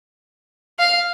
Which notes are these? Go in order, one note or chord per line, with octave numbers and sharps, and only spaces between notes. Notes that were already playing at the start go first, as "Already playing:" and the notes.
F5